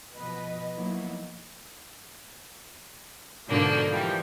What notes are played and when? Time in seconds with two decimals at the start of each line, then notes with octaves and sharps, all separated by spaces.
0.15 B2 F3 B4 D#5
0.74 F3 F#3 A#3 B3 D#4 E4
3.48 G#2 B2 D3 F3 A#3 D4
3.90 E3 F3 G3